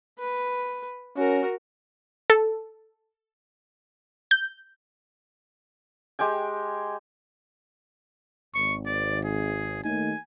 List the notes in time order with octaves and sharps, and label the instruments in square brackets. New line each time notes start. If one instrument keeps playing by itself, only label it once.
[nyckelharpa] B4
[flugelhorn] C#4 [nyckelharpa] F#4 A#4
[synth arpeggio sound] A4
G6
[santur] G#3 G4 G5 G#5
[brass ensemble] G#1 [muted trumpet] C#6
[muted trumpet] D5
G#4
[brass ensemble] D#2 A3 D#4 [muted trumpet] G#5